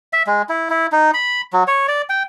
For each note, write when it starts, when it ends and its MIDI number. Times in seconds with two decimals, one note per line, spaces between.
0.13 0.23 76
0.27 0.42 56
0.49 0.69 64
0.70 0.87 64
0.92 1.11 63
1.14 1.41 83
1.53 1.64 54
1.67 1.87 73
1.88 2.02 74
2.09 2.23 79